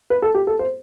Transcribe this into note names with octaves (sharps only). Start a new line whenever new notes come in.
B4
A4
G4
A4
C5